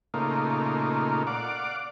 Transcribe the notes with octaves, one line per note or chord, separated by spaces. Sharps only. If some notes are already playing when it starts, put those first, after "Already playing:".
A#2 C#3 A3 A#3 D#4 F4
D5 F5 F#5 D6